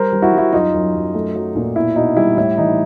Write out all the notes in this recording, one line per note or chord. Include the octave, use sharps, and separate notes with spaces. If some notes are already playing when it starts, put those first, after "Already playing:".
Already playing: G3 A#4 C5
G3
E4 F#4
G3
E4 F#4
F#2 D#4 F4
F#2
F#2
A3
F#3
A#2
B2 E4
B2 D#4
G3 E4
A2 E4
E3 D#4